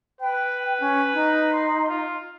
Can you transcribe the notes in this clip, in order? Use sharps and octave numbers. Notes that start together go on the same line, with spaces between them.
B4 G5
C#4
D#4
C6
F4